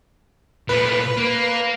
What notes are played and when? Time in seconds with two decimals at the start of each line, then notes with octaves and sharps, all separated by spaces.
0.69 A#2 A3 B4
1.17 A#3